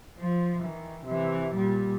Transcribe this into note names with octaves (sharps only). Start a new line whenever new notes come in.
F3
D#3 E3
C3 E3
A#2 G3